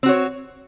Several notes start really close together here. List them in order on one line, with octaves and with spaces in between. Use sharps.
C4 F#4 C#5